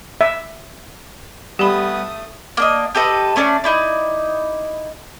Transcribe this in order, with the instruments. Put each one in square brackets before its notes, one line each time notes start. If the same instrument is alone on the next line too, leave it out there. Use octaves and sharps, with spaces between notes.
[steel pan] E5
[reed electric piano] G3 [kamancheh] A3 D#6 [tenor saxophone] B3 [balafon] G4 B5
[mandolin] A#3 D4 D#5
G4 A4 B4 D#5
A3 C#4 D4 D5
D#4 E4 D5